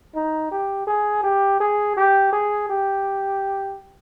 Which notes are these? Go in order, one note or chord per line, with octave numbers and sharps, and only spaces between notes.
D#4
G4
G#4
G4
G#4
G4
G#4
G4